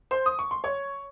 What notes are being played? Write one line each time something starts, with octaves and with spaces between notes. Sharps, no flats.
C5 C6
D#6
C#6
C6
C#5 C#6